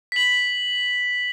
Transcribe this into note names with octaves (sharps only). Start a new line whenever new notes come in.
B6 F#7